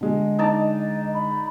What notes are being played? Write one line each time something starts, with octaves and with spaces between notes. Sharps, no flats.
D3 G#3 D#5
D#4 D5 A5
B5